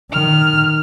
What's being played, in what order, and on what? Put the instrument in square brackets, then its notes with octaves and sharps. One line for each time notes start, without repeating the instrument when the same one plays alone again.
[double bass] D#3 [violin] F6